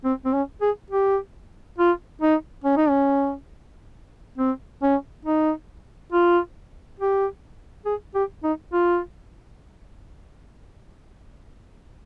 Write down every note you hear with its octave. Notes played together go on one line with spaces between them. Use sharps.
C4
C4
C#4
G#4
G4
F4
D#4
C#4
D#4
C#4
C4
C#4
D#4
F4
G4
G#4
G4
D#4
F4